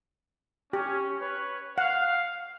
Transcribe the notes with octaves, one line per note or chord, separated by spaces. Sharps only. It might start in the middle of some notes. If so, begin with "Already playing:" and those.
C#4 G4
B4 C#5
F5 F#5